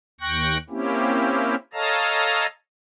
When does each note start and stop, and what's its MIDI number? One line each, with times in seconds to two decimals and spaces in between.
0.21 0.58 39
0.21 0.58 79
0.21 0.58 85
0.21 0.58 90
0.21 0.58 94
0.70 1.55 58
0.70 1.55 60
0.70 1.55 61
0.70 1.55 64
0.70 1.55 67
1.73 2.46 69
1.73 2.46 73
1.73 2.46 75
1.73 2.46 77
1.73 2.46 81
1.73 2.46 82